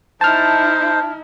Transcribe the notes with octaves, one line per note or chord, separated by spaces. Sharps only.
D#4 E4 C5 A5 F6